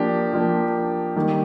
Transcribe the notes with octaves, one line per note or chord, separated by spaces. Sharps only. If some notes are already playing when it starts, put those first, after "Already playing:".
Already playing: F3 A#3 D4 G4
F3 A#3 D4
D#3 G3 A#3